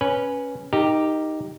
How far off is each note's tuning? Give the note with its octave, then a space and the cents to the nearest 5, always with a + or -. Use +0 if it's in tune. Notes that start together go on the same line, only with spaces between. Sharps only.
C#4 +0 B4 -10
D#4 +0 G4 +0 A#4 -25